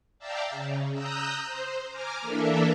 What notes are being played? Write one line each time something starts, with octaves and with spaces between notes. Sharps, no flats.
D5 E5 F5 G5 A5 A#5
C#3
A#5 D#6 E6 F#6 G6
C5
G#5 A#5 D6 F6
E3 A#3 D4 A4 A#4 E5